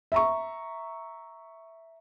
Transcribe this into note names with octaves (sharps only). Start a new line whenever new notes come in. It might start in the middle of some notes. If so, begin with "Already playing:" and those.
E5 A#5 C#6